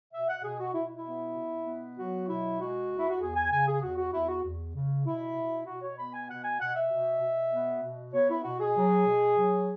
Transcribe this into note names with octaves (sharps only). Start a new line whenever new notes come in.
B2 E5
F#5
B2 G#4
F#4
B2 E4
E4
B3
B2
B3
F#3 F#4
B2 E4
G#3 F#4
E2
E4
F#4
E2 G#4
G#5
C#3 G#5
G#4
E2 F#4
F#4
E2 E4
F#4
E2
C#3
B2 E4
B2
B2 F#4
C#5
B3 B5
G#5
B2 F#5
G#5
B2 F#5
E5
B2
B2
B3
B2
B3 C#5
E4
B2 F#4
G#4
F#3
B2
F#3